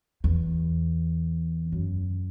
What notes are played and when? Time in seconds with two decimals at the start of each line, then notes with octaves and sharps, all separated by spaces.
0.24 E2
1.72 F#2